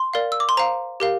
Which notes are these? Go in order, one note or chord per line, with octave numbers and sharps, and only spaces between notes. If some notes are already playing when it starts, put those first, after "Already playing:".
Already playing: C6
A#4 D5 F5
E6
D6
C6
C5 F5 A#5
G4 A#4 F5